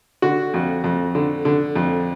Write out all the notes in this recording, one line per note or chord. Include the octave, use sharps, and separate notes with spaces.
D3 F#4
F2
F2
D3
D3
F2